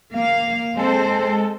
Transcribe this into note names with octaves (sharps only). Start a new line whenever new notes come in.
A#3 F5
G#3 C4 A4 C5